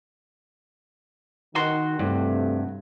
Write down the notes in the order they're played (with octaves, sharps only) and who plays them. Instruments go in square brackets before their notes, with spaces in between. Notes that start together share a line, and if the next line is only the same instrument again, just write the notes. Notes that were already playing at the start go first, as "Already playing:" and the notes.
[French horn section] D#3 [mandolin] F#4 C6
[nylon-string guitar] G2 [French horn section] C3 A3